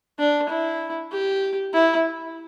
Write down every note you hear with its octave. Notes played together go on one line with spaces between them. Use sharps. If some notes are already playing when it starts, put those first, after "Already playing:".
D4
E4
G4
E4